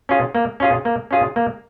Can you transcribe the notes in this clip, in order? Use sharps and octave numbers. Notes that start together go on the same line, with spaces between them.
C#4 F4 G#4
A#3
C#4 F4 G#4
A#3
C#4 F4 G#4
A#3